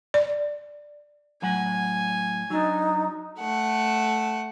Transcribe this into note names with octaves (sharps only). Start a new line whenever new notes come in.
D5
A2 F#3 F#5 G#5
F#3 D4 D#4
A3 F#5